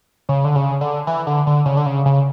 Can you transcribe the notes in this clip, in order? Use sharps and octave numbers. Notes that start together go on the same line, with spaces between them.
C#3
D3
C#3
D3
E3
D3
D3
C#3
D3
C#3
C#3